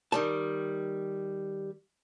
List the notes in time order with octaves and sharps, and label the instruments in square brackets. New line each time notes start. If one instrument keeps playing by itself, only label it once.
[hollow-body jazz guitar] D#3 G3 A5